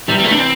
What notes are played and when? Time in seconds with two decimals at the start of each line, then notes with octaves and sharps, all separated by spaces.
0.08 C3 E3 G3
0.18 G3
0.24 A3
0.32 D4
0.40 C4